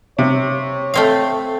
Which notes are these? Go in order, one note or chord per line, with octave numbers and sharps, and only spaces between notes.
C3 C#5
A3 C4 F5